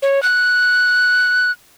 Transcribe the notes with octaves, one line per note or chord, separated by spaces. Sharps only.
C#5
F#6